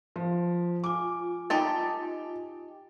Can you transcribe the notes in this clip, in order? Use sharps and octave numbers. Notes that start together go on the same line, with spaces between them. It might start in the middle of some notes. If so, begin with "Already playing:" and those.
F3
F4 G#5 D6
D#4 G4 A5